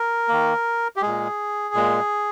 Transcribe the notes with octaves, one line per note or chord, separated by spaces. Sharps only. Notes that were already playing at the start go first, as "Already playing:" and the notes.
Already playing: A#4
D#3 A#3
G4
A#2 G#3 G#4
A#2 G#3